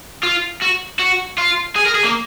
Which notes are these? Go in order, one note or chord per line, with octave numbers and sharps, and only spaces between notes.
F4
F#4
F#4
F4
G#4
A#4
G#4
A#3